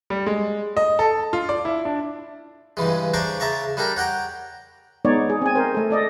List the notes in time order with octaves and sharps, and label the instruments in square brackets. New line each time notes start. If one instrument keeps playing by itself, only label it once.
[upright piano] G3
G#3
D#5
A4
F4
D5
E4
D4
[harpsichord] G2 C#3 E3 G#3
C#3 D4 C5 A#5 C#6 D6
C#3 E5 A5 A#5 C#6
G3 D4 G4 A4 A#4
C#5 F#5 G5 A#5
[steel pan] G#3 B3 D#4 C#5 D5
G#4
C4 G#5
A#4 C5
A3 A4
A4 D5 D#5